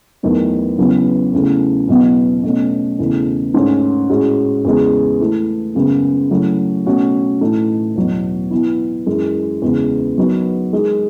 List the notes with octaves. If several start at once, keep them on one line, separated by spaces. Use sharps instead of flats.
E2 D#3 F#3 A3 D#4
E2 C#3 F#3 B3 E4
E2 C#3 E3 A3
E2 B2 F#3 B3
B2 A3 C#4
E2 C#3 E3 A3
G#2 D#3 A3 C#4
A2 G#3 C#4 F#4
E2 C#3 G#3
E3 A3 E4
F#2 C#3 G#3 B3
C#3 F#3 A3 E4
B2 A3 C#4 F#4
A2 E3 A3 D#4
E2 B2 F#3
E3 B3 E4
F#2 E3 G#3
E2 C#3 G#3
D#3 F#3 B3 D#4 F#4
D#3 G#3 D#4